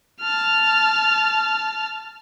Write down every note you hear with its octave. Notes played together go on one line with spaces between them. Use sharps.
A5 F6